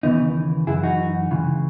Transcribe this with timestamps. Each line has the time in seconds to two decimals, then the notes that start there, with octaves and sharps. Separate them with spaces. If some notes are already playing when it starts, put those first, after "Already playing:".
0.03 D#2 C#3 E3 B3 D#4
0.67 F#2 E3 E4 G#4
0.83 D#4 F#4
1.31 C#2 C#3 E3